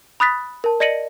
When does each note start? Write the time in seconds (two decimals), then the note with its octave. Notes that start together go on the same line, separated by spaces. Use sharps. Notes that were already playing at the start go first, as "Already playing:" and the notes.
0.20 B5 D#6 F#6 A6 B6
0.64 A#4 A5
0.80 D5 D#5 A#6 C#7 D#7 F#7